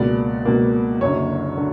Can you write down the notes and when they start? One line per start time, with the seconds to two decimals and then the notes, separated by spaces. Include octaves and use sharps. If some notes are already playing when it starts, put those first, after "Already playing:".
Already playing: C#2 B2 A#3 D5
0.45 C#2 B2 A#3
1.01 F#1 F#2 D3 C#5
1.58 D3